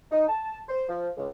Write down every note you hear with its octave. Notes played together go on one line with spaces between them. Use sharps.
D#4
A5
C5
F3
C#2